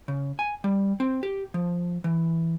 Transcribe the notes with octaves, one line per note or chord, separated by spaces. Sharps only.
C#3
G#5
G3
C4
G4
F3
E3